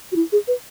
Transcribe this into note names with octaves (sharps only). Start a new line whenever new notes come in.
F#4
E4
G#4
B4